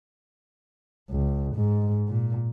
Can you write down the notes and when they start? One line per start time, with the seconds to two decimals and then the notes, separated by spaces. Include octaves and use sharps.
1.10 C#2
1.55 G#2
2.08 A#2